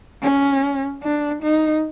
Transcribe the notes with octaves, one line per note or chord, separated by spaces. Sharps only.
C#4
D4
D#4